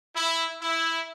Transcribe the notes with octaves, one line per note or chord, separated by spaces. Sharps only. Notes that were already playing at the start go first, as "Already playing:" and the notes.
E4
E4